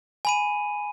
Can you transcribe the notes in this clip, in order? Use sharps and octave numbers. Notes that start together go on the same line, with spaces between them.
G#5 B5 D#7